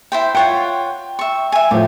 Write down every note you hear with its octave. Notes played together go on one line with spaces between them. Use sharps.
E4 C5 G5
F4 C#5 F#5 G5
E5 C#6
E5 G#5
A2 F3 G4